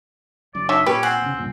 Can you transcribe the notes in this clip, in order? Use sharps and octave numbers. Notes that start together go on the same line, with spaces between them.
F#1 F#2 D5
D4 D#4 C#5 E5
A#2 C#4 G4 B4
C4 F#5 G#5
E1 C#3
C2 G2 A#2